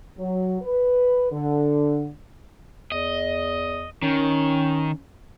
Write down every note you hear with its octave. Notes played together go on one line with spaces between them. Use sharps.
F#3
B4
D3
E2 D#5
D#3 C#4